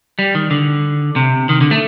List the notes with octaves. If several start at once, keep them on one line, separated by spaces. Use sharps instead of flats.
G3
D#3
D3
C3
D#3
D3
A3